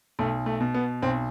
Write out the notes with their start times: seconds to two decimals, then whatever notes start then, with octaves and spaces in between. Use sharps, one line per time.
0.19 B1 A3
0.46 A3
0.61 B2
0.74 B3
1.02 B1 C4